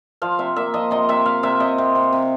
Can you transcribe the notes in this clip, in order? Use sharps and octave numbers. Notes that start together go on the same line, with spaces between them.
F3 F5
C3 E5
A#3 E5
F3 D#5
C3 D#5
C3 E5
C3 F5
C3 E5
C3 D#5
C3
C3
C3